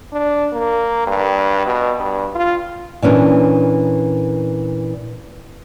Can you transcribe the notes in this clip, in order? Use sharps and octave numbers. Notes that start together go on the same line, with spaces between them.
D4
A#3
G2
B2
G2
F4
A#2 E3 C#4 D4